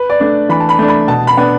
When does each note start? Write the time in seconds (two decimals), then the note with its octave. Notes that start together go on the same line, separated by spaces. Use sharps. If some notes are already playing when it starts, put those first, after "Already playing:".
Already playing: B4
0.10 D5
0.20 A3 D4
0.49 E3 B5
0.60 A5
0.69 B5
0.79 A3 D4
0.88 B5
1.08 B2 A5
1.27 B5
1.37 B3 D4